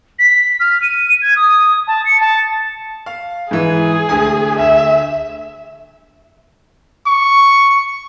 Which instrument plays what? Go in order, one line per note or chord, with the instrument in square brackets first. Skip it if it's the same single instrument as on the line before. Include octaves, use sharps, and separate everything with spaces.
[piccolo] B6
F6
D#7
G#6
D#6
A5
C#7
A5
[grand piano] F5
[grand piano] G#2 E3 [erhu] G#4
[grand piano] D2 G#5
[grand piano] D2 [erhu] E5
[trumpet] C#6